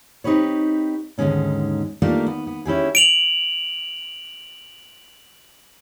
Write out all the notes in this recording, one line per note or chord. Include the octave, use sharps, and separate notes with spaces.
C4 D#4 G4 B4 C#5
D#2 G#2 D3 G#3 C#4 D#4
A3 A#3 D4 D#4 F4 G4
B3
B3
C#4 E4 G4 G#4
D7 F7 F#7